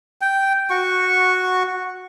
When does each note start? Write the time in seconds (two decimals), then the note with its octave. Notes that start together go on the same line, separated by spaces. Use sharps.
0.21 G5
0.70 F#4 C#6